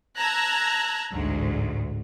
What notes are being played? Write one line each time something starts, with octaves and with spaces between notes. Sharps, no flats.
A5 A#5 E6 F#6 G#6 A#6
A1 D2 G#2